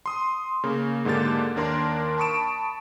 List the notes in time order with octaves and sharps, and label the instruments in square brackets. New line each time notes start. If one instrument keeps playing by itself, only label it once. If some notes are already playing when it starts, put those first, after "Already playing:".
[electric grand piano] C6 D#6
C#3 A#3
G#2 D3 A#3 G4 A6
D#2 A#3 D4 A#4 D5 C6
A5 B5 C#6 D#6 D7 E7